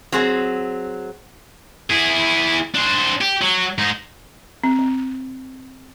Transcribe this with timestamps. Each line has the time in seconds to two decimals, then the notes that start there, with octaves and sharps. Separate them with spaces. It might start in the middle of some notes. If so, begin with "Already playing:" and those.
0.12 F#3 C4 G#4
1.90 E4 G#4
2.75 D4 C5
3.21 G4
3.41 F#3
3.78 G#2 D#4
4.64 C4
4.79 C4